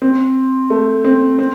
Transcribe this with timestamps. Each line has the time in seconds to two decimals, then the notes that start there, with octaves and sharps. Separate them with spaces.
0.02 C4
0.70 A3
1.04 C4
1.39 C4